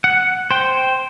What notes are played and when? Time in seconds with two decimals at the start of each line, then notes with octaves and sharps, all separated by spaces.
0.04 F#5
0.51 C5 G5